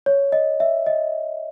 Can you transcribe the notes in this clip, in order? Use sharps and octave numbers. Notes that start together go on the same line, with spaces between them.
C#5
D#5
E5
D#5